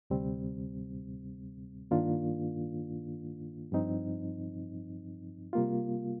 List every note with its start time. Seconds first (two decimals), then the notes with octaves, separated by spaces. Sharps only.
0.10 D2 C3 G3 C4
1.91 G2 D#3 A#3 D4 F4
3.72 G2 F3 C4 D#4
5.53 C3 G3 A#3 F4